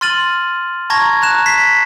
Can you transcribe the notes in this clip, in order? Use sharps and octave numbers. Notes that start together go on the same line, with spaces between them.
C6 F6 A6 D#7 F#7
A5 A#5 C#6 G#6 A#6
A#5 F#6 E7
B6 C7